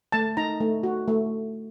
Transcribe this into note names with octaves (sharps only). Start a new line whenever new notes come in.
A3 A5
D#4 A#5
A3
F#4
A3